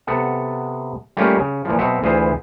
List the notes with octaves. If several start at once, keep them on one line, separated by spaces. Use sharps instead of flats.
C3 B3 A4 F#5
G3 A3 A#3 C#4 F4 G4
C#3
A#2 E3 F3
B2 F#3 C4 E5 F#5
D2 E3 F4 G#4 B4 C5